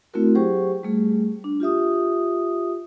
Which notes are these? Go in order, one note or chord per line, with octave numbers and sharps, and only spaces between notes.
A3 C4 E4 F#4 A#4
F#3 G4 G#4 C5 G5 C#6
G3 A3 G#4
D4
F4 G4 E5 D#6